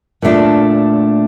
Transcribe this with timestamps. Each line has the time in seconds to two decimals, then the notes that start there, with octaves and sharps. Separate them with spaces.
0.22 A#2 A3 D4